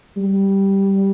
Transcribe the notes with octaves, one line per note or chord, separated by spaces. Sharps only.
G3